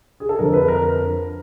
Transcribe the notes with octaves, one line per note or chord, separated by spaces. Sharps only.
G#4
A4
F2 D3 A#4
B4
A#4